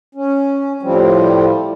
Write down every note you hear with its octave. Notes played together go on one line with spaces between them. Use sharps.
C#4
A2 F3 G3 C4